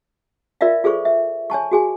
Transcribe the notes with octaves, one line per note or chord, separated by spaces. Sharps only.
F4 A#4 D5 E5 F5
F4 G#4 A4 C5 C#6
E5
C#5 G#5 A5 C#6
F#4 G#4 G#5